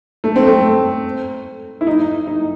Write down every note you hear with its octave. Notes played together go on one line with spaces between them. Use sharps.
A3
C4
A3
E4
D#4
D#4